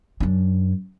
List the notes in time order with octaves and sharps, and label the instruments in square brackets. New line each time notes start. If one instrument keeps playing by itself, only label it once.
[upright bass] F#2 D4